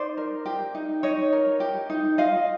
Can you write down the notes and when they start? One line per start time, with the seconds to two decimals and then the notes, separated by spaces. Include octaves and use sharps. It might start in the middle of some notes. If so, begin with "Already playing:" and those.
Already playing: D#4 C5 D5
0.17 A#4
0.46 G4
0.75 D#4
1.03 D#4 C#5 D#5
1.33 A#4
1.60 G4
1.90 D#4
2.18 F4 D#5 F5